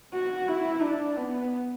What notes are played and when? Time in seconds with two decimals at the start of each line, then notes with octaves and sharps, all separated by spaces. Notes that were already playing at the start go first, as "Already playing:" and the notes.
0.13 F#4
0.48 E4
0.82 D4
1.17 B3